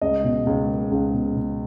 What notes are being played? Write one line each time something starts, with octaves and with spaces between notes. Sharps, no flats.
C#2 D#5
B2
C#2
A#3
C#2
B2
B2